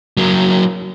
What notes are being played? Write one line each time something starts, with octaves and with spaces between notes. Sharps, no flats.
F#3 A#3